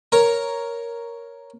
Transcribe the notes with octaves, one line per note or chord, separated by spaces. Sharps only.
A#4 C#5